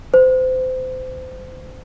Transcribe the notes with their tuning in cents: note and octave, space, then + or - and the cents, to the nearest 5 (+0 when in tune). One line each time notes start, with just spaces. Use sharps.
C5 -30